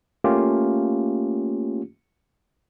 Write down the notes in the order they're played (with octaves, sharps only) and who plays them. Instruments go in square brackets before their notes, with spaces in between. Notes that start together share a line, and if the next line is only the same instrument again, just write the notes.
[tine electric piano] A3 A#3 C#4 F4 G4